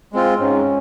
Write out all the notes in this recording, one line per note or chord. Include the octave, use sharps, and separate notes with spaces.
G#3 C4 F4
G#2 C#4